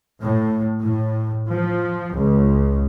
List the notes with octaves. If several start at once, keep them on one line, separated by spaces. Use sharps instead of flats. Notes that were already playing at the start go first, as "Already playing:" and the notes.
A2
A2
F3
C#2